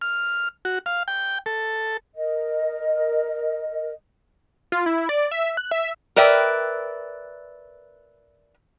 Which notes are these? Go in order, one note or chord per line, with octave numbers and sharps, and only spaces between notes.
F6
F#4
F5
G5
A4
A#4 D#5
F4
E4
D5
E5
F#6
E5
A#4 B4 D5 E5 G5